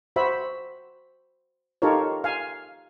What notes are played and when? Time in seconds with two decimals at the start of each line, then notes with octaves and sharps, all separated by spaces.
0.16 F#4 C5 E5 B5
1.82 D#4 F4 G4 A4 A#4 C#5
2.24 F5 G#5